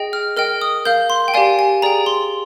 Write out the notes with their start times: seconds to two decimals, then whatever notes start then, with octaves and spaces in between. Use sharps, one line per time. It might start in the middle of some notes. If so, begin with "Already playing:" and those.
Already playing: G#4 D#5 G5
0.13 F6
0.37 A#4 D#5 G5 F6
0.61 D#6
0.85 A#4 F5 G6
1.10 C6
1.28 G5
1.34 G4 D5 F5 G#5
1.59 G#5
1.82 G#4 D5 G5 A#5
2.06 C6